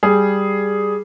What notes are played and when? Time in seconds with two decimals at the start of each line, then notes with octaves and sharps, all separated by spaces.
0.03 G3 G#4